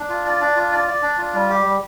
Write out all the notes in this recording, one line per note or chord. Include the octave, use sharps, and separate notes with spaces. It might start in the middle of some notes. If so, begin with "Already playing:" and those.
Already playing: D4
F4
D5
D4
F4
D5
D5
D4
F4
G3
G4
G3